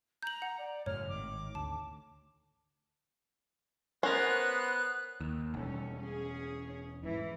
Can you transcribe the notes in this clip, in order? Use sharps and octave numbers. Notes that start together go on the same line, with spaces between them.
A#5 G6 F#7
F#5
D5
F#2 A2 C#3 C#5 F6
G#1 D#3 D6
D2 A5
B3 C#4 A#4 C5 F#6
D#2
E1 G3 C#4 A4
C#4 G#4
G#2 E3